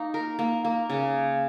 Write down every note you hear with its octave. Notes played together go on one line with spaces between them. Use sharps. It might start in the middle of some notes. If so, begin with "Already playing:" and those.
Already playing: A#3 D#4
A#4
A#3
A#3
C#3